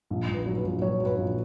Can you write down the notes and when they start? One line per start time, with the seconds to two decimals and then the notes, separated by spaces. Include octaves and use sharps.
0.10 A#1
0.28 A#1
0.34 B4
0.46 F#3
0.57 B4
0.64 A#1
0.82 F#3 C#5
1.00 F#3
1.06 B4
1.18 A#1